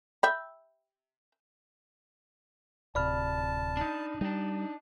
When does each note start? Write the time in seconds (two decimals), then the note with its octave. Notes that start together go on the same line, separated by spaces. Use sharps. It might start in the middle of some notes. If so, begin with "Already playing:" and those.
0.23 E5 G5 B5
2.95 D1 C3 D5 A5 B5 F6
3.77 D4 D#4
4.21 G3 D4 D#4